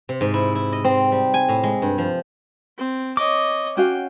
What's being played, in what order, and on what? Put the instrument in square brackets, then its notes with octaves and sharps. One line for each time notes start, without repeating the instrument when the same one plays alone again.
[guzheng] C3
G#2
E4
E4
D#5
C4
G3
G#5
A2
G#3
G2
F3
[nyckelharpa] C4
[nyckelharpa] C#5 D#5 [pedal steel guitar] D6
[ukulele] C#4 F#4 F5 [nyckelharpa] G5